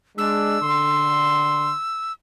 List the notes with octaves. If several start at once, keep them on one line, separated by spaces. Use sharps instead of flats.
G#3 D4 E6
D3 C6